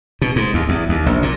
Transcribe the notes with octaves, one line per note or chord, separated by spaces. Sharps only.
B2
G#2
D#2
E2
D#2
A#1
A#2